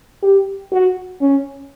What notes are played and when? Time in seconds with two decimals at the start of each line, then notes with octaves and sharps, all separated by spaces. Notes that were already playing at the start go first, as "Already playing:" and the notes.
0.23 G4
0.72 F#4
1.21 C#4